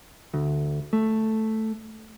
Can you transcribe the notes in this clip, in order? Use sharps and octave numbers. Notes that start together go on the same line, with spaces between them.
D2
A3